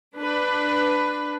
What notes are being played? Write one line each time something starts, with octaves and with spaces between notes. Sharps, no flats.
D4 B4